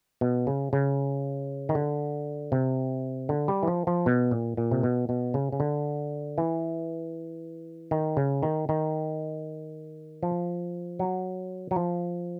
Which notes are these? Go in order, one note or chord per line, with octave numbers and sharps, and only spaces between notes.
B2
C#3
C#3
D#3
D3
C3
D3
G3
E3
F3
F3
B2
A#2
A#2
C3
B2
B2
C#3
C#3
D3
E3
D#3
C#3
D#3
D#3
F3
F#3
F#3
F3